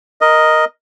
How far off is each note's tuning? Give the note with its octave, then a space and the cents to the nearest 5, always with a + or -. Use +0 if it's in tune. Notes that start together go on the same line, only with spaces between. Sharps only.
A#4 +5 D#5 +0